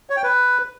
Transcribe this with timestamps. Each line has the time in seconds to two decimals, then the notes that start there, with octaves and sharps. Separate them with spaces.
0.10 C#5
0.17 G5
0.23 B4